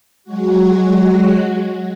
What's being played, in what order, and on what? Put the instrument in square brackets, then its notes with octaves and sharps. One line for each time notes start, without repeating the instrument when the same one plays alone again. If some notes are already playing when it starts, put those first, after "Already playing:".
[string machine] F#3 G#3 F#4